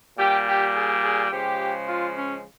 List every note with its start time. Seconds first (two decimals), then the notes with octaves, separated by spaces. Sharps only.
0.18 A#2 G3 G4
0.46 G4
0.74 G#4
1.03 G#4
1.31 C#3 F3 G#3 G4
1.87 F4
2.16 C#4